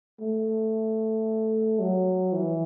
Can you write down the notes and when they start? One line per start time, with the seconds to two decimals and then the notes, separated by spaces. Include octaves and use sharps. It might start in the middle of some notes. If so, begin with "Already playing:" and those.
0.21 A3
1.80 F#3
2.33 E3